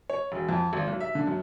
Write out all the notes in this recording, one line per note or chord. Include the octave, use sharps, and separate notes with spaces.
C#5
E1
F2
G#1
B1
E5
D3
F#2